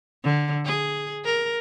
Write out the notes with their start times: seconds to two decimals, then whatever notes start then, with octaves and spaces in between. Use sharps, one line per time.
0.23 D3
0.65 G#4
1.25 A#4